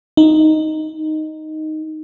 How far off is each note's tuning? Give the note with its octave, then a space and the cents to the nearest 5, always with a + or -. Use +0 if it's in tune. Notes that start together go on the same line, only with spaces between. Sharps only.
D#4 +0